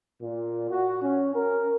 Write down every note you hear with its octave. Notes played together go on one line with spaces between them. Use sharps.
A#2
F#4
C#4
A#4